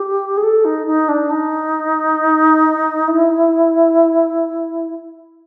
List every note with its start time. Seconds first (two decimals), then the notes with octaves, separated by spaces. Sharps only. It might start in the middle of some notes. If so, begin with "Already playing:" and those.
Already playing: G4
0.37 G#4
0.43 A4
0.65 D#4
0.87 D#4
1.08 D4
1.31 D#4
3.08 E4